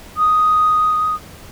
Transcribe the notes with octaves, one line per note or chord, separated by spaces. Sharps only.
D#6